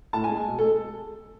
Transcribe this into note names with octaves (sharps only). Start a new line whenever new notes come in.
A2 A5
G#5
G#3
B2
A4
G#3